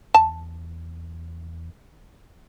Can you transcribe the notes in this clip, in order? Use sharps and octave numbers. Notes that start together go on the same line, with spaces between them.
E2 A5